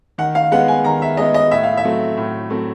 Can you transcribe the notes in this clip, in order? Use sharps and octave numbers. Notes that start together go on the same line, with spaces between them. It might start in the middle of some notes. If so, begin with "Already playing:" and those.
D#3 F#5
F5
G#3 B3 F#5
G#5
D#3 A#5
E5
G#3 B3 D#5
D#5
A2 E5
F5
E5
F#3 A3 C4
A2
F#3 A3 C4